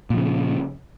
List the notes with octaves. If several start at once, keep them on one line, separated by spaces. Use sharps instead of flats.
A#2 C#3 F3